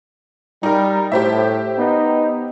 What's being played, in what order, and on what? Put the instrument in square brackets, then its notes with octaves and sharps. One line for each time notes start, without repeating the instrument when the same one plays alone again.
[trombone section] G3 [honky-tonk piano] D#4 A#4
[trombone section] A2 [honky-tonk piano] G4 C5 E5
[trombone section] B3 D#4